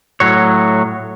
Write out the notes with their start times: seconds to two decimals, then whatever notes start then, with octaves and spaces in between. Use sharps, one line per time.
0.20 A2 F#3 C#5